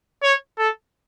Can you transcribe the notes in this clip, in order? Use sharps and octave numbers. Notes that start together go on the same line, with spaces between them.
C#5
A4